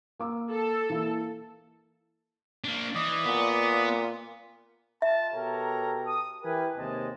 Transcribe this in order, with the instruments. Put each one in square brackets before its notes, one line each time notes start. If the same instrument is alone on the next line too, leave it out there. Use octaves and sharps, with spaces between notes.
[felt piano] A#3 D6 E6
[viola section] A4
[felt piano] E3 A#3 E4
[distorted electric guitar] A#3 D4
[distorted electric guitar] E3 [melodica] D5 D#5
[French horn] A#2 [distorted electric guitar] B3
[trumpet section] F4 A5 [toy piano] E5
[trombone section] B2 G4 A4 [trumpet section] A#4 C#5 A#5
[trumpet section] D#6
[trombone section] E3 G4 A#4 [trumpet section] B4 G#5
[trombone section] D#2 C3 [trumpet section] G#3 D#5 A5